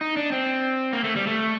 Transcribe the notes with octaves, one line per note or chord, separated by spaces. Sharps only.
D#4
D4
C4
A#3
A3
G3
A3